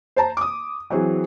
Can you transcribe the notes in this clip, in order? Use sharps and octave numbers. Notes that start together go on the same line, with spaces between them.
C5 A5 A#5
D6 D#6
E3 F#3 C4 F#4 G#4